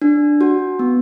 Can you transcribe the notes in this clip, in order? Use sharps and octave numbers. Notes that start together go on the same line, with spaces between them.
D4
F#4
B3